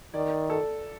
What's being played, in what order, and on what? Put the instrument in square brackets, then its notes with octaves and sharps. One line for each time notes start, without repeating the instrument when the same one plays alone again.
[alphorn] D#3 [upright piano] D5
[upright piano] A4